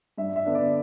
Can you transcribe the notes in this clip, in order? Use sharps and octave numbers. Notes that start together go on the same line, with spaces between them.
G2 E5
E5
D3 B3 D4
D5